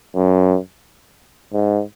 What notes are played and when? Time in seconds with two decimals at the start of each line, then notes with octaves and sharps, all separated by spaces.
0.15 F#2
1.54 G#2